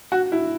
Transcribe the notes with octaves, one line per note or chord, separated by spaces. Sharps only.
F#4
E4